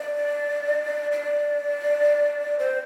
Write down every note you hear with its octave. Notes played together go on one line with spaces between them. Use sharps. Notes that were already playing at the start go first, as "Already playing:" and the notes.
Already playing: D5
D5
C5